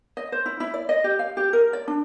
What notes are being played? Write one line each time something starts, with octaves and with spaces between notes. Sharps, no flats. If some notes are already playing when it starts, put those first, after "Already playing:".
D#5
C5
E4
E4
D5
D#5
G4
F5
G4
A#4
D5
D4